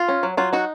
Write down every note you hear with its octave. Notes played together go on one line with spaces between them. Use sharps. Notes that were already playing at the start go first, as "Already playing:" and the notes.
Already playing: F4
C#4
F#3
F#3 F4
D#4 F#4